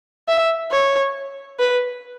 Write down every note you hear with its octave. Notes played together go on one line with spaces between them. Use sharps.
E5
C#5
B4